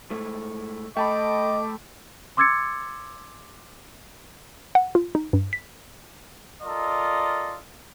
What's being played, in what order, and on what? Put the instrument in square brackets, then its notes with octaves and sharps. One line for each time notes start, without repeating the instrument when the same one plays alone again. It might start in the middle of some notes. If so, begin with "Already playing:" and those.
[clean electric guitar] G#2 A3
[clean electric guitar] A3 [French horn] D#5 [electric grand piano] G5 A5 B5 [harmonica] D6
[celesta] C6 D6 E6 G#6 A6 C#7
[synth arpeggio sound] F#5
F4
D#4
G2
B6
[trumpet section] F4 A4 A#4 D5 D#5